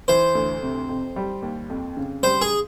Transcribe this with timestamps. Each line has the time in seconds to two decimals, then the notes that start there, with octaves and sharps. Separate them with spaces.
0.08 E3 C5
0.35 D2
0.63 C3
0.89 F2
1.16 G3
1.42 D#2
1.70 F2
1.97 C#3
2.23 G3 C5
2.41 G#4